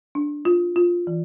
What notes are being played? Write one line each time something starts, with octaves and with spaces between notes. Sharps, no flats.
D4
F4
F4
E3